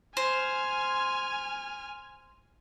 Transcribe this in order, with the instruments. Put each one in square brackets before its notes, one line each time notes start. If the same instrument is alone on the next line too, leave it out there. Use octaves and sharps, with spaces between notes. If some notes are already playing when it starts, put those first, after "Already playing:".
[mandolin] C5 [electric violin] G#5 F6